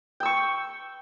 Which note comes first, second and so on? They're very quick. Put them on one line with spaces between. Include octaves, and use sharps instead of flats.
G5 E6 C#6